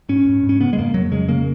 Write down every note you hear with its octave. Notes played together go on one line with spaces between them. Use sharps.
G#2 C#4
G#2
G#2
C#4
C#3 B3
G#3
F2 A#3
F2 F#3
C#3 G#3
C#3 A#3